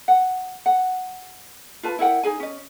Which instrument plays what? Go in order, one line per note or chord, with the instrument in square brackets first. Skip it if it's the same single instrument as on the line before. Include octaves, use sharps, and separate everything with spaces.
[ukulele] F#5
F#5
F4 B4 A5
E4 A#4 F#5 G5
D#4 G#4 G#5
C#4 D#5